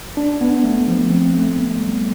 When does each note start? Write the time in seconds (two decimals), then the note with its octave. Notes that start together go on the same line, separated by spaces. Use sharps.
0.17 D4
0.41 B3
0.64 A3
0.88 F3
1.11 C4
1.34 A3
1.58 B3
1.81 G3